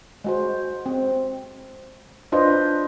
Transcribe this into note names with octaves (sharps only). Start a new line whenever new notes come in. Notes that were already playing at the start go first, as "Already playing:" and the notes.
G#3 F#4 C5
C4
D4 F4 B4 C5 D#5